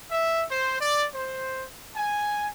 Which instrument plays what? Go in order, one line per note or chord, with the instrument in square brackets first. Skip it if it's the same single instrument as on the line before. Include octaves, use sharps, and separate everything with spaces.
[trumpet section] E5
C5
D5
C5
G#5